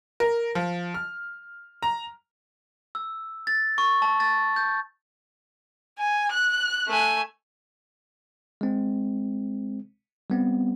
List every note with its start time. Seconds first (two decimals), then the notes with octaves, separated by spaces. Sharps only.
0.20 A#4
0.55 F3
0.94 F6
1.83 A#5
2.95 E6
3.47 A6
3.78 C#6
4.02 A5
4.20 A6
4.56 G6
5.99 G#5
6.32 F#6
6.88 A3 G#5
8.61 G#3 C4
10.30 G3 B3 C4